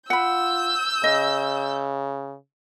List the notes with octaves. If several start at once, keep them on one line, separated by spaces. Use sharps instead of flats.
F4 F#5 B5 E6 G6
C#3 D#5